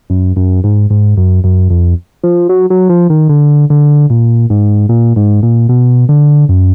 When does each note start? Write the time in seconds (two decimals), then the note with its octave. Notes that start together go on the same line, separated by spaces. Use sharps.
0.10 F#2
0.36 F#2
0.64 G#2
0.90 G#2
1.17 F#2
1.44 F#2
1.70 F2
2.23 F3
2.49 F#3
2.70 F#3
2.89 F3
3.10 D#3
3.29 D3
3.70 D3
4.10 A#2
4.50 G#2
4.89 A#2
5.16 G#2
5.43 A#2
5.69 B2
6.09 D3
6.49 F#2